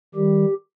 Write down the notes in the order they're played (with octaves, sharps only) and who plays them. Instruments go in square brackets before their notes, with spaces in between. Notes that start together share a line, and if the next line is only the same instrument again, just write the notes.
[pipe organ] D#3 G3 G4